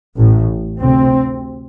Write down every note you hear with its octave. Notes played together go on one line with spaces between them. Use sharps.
A1 A2
D2 C3 C4